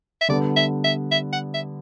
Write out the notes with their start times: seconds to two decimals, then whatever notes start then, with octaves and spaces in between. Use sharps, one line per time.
0.21 E5
0.28 D3 G3 B3 D5
0.56 E5
0.84 E5
1.12 E5
1.33 F#5
1.54 E5